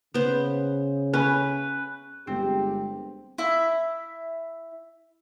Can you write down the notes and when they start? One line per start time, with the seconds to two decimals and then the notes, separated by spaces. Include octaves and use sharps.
0.14 C#3 B3 C5
1.14 C#4 B4
2.27 G1 G#3 C4 G4
3.38 E4 E5